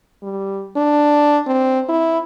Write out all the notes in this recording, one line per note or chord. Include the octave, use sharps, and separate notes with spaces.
G3
D4
C4
E4